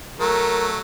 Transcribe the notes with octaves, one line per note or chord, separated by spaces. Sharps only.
F#3 A3 A#4